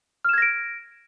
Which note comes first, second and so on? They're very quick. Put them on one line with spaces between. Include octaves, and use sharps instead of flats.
F6 E7 G#6 A#6 D7